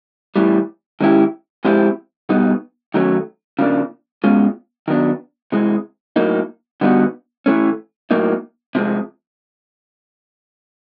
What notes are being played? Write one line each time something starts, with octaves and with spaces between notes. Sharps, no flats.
A2 E3 G3
D#3 G#3 C#4 E4 G4
F3 G#3 C4 E4 G4
B2 G3 B3 D#4
D#3 F#3 A3 C#4
C#3 F3 A#3 D4
B2 G#3 C#4 F4
D#3 F#3 B3 D4
C3 E3 G#3
A2 F#3 A#3 D#4
D3 G3 B3 D#4 F#4
E3 A3 C#4
A2 F#3 A#3 D#4
C3 F3 G#3